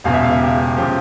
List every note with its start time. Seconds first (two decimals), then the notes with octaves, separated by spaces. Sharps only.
0.04 E1 E2 C#3 F5
0.13 E5
0.23 F5
0.32 E5
0.41 G4
0.77 C#3 F3 G4